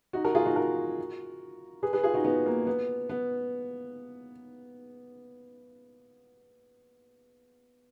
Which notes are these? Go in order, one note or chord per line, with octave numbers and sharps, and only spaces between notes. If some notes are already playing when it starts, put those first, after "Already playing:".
D#4 F#4
F#4 A#4
F4 G#4
D#4 F#4
F#4 A#4
G#4 B4
G#4 B4
F4 G#4
D#4 F#4
B3 D#4
A#3
B3
B3